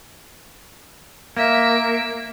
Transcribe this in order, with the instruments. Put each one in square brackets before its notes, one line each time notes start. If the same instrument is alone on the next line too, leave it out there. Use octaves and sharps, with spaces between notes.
[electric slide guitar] A#3 [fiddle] E5